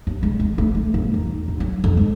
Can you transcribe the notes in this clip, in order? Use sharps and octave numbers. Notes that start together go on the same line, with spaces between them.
D#2
C#2
G#3
A3
G#3
E2
D#4
D#2
F#3
F2
G#3